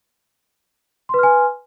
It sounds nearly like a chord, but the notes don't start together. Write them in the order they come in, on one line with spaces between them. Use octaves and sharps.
C6 B4 F6 G#5